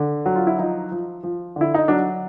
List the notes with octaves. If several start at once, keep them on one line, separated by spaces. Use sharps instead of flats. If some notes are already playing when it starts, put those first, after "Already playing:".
Already playing: D3
F#3
F4
E4
F3 D#4
F3
F3
D3 E4
D#4
F#3 D4